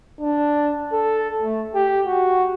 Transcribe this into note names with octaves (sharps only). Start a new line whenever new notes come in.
D4
A4
A3
G4
F#4